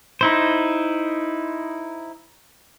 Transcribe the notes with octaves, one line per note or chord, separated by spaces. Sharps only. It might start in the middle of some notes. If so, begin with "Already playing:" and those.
D#4 E4 C5